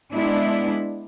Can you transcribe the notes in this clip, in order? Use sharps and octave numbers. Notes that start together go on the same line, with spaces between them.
G#3 B3 D4 E4